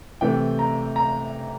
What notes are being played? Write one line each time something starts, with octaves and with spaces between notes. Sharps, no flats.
C3 E3 A3 G5
A#5
A#5